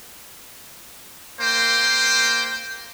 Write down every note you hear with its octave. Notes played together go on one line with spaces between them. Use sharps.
A#3 C5 G5